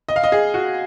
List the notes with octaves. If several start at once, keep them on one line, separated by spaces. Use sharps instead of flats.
D#5
F5
D#5
G#4
F#4